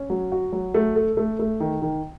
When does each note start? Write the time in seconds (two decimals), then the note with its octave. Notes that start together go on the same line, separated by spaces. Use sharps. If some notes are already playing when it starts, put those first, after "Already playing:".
Already playing: C#4
0.10 F#3
0.32 F#4
0.53 F#3
0.74 A3
0.96 A4
1.17 A3
1.39 A3
1.60 D#3
1.82 D#3